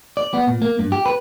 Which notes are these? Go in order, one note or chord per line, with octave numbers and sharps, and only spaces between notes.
D5
B3
A#2
A#3
G2
G4
B4